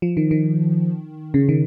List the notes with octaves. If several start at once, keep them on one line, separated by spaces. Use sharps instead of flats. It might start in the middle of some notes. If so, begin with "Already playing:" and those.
F3
D#3
D#3
C#3
D#3